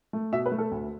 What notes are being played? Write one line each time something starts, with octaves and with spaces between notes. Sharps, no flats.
A3
B2 E5
B4
A3
A4
D2